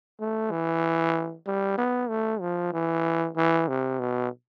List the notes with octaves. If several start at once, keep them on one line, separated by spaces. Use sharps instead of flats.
A3
E3
G3
B3
A3
F3
E3
E3
C3
B2